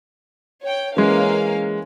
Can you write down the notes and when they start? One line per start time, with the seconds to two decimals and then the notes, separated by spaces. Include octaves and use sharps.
0.64 C#5 G5
0.97 E3 G#3 A#3 C#4 F5